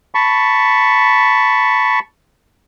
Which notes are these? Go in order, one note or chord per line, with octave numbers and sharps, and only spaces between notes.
A5 B5 C#6